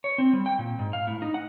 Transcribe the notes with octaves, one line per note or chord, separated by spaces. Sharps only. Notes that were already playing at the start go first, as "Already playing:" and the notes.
C#5
C4
G3
G5
A#2
G#2
F5
A2
D#4
F#5